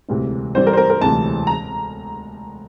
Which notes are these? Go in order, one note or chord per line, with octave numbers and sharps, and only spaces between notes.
E1 D2 C3 E3
G2 E3 G3 D4 C5
A#4
C5
A#4
A#4
E1 D2 C3 E3 A5
A#5